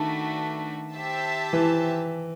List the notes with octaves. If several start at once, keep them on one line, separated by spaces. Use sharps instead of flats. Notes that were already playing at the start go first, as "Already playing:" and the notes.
Already playing: D#3 A3 D4 F#4 B4
G4 C5 E5 A5
E3